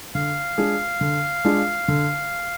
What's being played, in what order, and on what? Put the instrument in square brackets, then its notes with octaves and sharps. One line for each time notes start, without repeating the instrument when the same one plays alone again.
[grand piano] D3 [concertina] F5
[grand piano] G#3 D4 F4 G#4
D3
G#3 D4 F4 G#4
D3